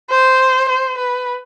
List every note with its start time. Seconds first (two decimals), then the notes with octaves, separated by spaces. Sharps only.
0.11 C5
0.69 C5
0.98 B4